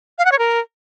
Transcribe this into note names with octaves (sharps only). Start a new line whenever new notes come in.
F5
F#5
C#5
A#4